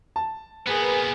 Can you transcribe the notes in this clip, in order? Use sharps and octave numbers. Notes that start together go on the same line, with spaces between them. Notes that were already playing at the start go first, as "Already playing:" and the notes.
A5
A#2 B3 G#4 A#4 B4